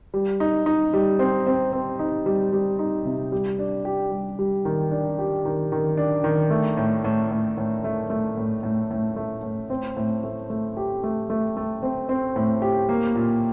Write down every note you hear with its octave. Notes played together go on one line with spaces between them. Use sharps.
G3
D#4
D#4
G3
C4
C4
C4
D#4
G3
G3
D#4
C3
G3
D4
G4
G3
G3
D#3
D4
G4
D#3
D#3
D4
D#3
A3
A2
A2
A2
A2
A3
A3
A2
A2
A2
A3
A2
C4
A2
A3
A3
G4
A3
A3
A3
C4
C4
A2
G4
A#3
A#2